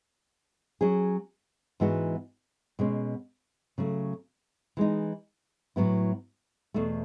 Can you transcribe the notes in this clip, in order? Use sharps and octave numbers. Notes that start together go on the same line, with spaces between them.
F#3 C#4 G#4
G#2 E3 G#3 B3 F#4
B2 G#3 C#4
C#3 F#3 A3
E3 G#3 D#4
A2 F#3 B3 E4
E2 B2 A3